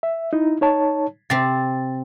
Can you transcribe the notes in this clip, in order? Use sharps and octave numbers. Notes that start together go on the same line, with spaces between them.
E5
D#4 E4
D#4 C#5 A5
C3 C4 A6